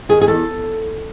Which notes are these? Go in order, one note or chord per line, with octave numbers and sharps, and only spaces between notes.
D#3 G#4
G#4
E2 A4